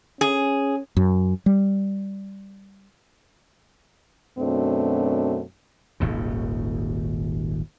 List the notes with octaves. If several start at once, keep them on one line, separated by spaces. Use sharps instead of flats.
C#4 G#4
F#2
G3
F#2 B2 A3 C4 D4
D#1 G#1 D#2 C#3